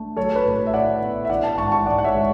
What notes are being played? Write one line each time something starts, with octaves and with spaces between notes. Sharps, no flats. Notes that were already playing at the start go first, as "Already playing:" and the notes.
Already playing: A3 D4
F#3 A4 C#5
B4
A2
A4
E5
E4 D5 F#5
B3
E5
E3 D5 F#5
F#5 A5
G#2 A5 C#6
A5 C#6
G#2 D5 F#5
F#5
C#5 E5
G#3